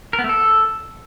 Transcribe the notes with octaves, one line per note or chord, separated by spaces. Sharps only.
A#4
B3
A3
A4